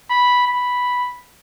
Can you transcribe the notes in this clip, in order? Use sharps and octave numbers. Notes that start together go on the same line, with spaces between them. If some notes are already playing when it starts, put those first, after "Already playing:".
B5
B5